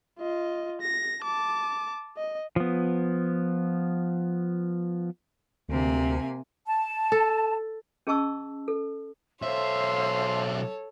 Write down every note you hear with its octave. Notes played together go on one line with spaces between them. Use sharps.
F4 D#5
A#6
A5 D6
D#5
F3 B3
D2 C3 A#3 G#5
A5
A4
C#4 G#4 D#5 A5 C#6 E6
A4
B1 A4 C5 C#5 E5 F5 C6 E6